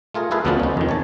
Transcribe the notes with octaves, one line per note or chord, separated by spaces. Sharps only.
A3 F4 G#4 A#4
E4 F4 G#4 A4 B4 F5
D2 C#3 F3 B3 D4 A5
C#4 D#4
F2 D#3
C#5 A5